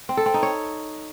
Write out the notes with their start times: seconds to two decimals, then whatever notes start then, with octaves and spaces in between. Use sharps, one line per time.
0.09 C4
0.17 A4
0.26 C4
0.34 D#4
0.43 C#5